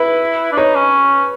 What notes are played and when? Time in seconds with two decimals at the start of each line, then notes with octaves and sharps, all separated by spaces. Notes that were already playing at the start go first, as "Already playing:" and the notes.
Already playing: E4 B4
0.52 D4
0.57 D#4 C#5
0.75 C#4